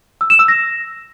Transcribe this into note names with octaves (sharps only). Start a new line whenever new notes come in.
E6
E7
E6
A#6